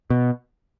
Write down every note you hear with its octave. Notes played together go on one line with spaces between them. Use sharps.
B2